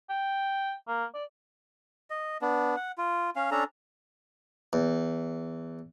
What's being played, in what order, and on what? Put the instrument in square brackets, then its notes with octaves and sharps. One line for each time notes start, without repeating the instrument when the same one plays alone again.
[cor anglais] G5
A#3
D5
[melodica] D#5
B3 D4
F#5
F4
C#4 F5
C#4 D4 A4 A#5
[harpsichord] E2